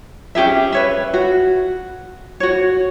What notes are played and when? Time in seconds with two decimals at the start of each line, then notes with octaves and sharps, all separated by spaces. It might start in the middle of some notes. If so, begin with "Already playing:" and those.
0.35 C#4 G4 G#4 E5
0.72 B4 C#5 E5
1.13 F#4
2.40 F#4 C#5